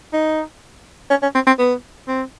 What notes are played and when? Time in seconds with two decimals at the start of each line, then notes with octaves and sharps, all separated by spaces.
0.13 D#4
1.10 C#4
1.22 C#4
1.35 C4
1.47 C4
1.59 B3
2.08 C4